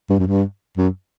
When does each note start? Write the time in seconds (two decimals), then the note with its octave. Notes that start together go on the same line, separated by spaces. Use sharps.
0.10 G2
0.19 F#2
0.28 G2
0.78 F#2